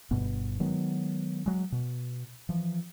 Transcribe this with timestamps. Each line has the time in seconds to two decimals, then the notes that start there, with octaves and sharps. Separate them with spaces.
0.11 G1 G2 B2 B3
0.60 D#3 F#3 G#3 B3
1.46 F#3 G#3
1.72 B2
2.49 E3 F3